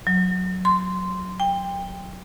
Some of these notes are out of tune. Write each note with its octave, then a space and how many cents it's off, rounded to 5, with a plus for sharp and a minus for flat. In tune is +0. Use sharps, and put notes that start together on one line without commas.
F#3 -5
C6 -10
G5 +20